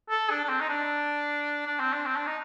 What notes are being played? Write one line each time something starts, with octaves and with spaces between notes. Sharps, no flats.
A4
D4
D4
C4
D#4
D4
D4
C4
D4
C4
D4
D#4